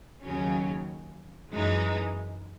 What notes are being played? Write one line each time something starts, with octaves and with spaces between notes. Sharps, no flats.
D#2 C#3 F#3 C#4
F#2 E3 G#3 D#4